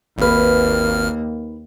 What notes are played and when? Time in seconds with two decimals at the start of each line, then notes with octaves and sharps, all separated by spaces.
0.18 G#1 D#2 A#3 D#4 B4 F6